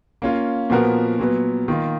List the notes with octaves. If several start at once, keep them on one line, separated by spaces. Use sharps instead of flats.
A#3 C#4 F4
A#2 F3 B3 F#4 A#4
A#2 F#3 B3
D#3 A#3 F4